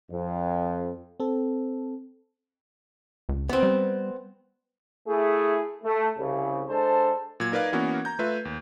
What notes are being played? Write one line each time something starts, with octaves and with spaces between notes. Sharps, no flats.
F2
C4 A4
C#2
B3 C4
G3
A3 E4 G#4
A3
C2 C#3
G#3 D4 A4 C5 A5
A#2 F#3 G#6
D#4 A#4 B4 D5 F5
E3 A#3 B3 C#4 F#4 A#4
A#5 G6
A3 F4 B4 E5
D#2